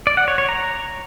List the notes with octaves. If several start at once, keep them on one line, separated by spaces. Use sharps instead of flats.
D5
F#5
C#5
C#5
A#5